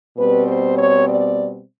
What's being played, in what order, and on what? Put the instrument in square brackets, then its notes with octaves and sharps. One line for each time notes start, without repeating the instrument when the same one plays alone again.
[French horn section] B2 G3 C4 B4
C5
C#5
D5